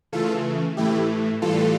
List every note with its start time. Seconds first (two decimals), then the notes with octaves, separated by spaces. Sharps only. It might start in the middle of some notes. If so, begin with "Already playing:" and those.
0.12 C#3 E3 A3 F4 A4
0.77 A2 E3 A3 E4 G4
1.42 A2 E3 G3 F4 A4